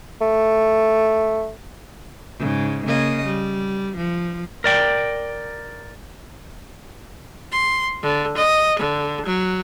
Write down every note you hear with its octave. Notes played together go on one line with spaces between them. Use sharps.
A3
G#2 C#3
C#3 A#3 D#5
G3
F3
A#4 D5 G5
C6
D3
D#5
D3
F#3